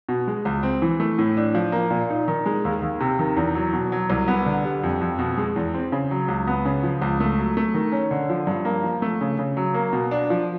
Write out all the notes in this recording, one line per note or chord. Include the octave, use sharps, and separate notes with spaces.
B2
G#3
C#2
C4
E3
A3
A2
D4
F3
A#3
A#2
D#4
D#3
G#3
D#2
D#2
C3
D#3
E2
F#3
B2
F#3
C2
B3
D3
G3
F2
F2
B2
G#3
E2
C4
C#3
F#3
C#2
B3
C#3
F3
C#2
A3
F#3
A3
D#3
C#4
D3
F3
G2
A#3
F3
A3
C#3
C#3
F#3
A#3
B2
D4
F3